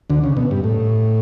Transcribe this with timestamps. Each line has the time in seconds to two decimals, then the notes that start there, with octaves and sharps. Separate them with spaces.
0.10 D2 D3
0.24 C#3
0.37 B2
0.51 G2
0.64 A2